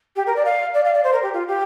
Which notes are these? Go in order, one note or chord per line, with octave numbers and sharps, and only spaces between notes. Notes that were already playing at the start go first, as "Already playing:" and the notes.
G4
A#4
D5
F5
D5
F5
D5
C5
A#4
G4
F4
G4